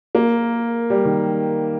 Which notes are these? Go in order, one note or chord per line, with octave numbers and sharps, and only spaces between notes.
A#3
G3
D#3